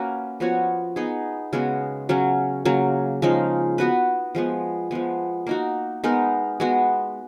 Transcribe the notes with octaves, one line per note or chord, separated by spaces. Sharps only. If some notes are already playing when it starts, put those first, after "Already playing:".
Already playing: A#3 C#4 F#4 B4
F3 B3 F#4 C#5
B3 D#4 G#4
C#3 G#3 B3 F#4
C#3 F#3 C#4
C#3 F#3 A#3
C#3 F3 G#3 D#4
B3 F#4 B4
F3 G#3 B3
F3 G#3 B3
A#3 D#4 F#4
G#3 B3 D#4 A#4
G#3 B3 F#4